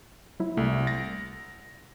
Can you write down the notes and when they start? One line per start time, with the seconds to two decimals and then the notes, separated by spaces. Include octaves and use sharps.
0.40 F#3 E4
0.57 C2 A3
0.87 A6 A#6 D7